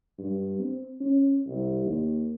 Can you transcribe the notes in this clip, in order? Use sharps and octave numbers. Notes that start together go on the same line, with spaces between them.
G2
C4
C#4
C2
D#2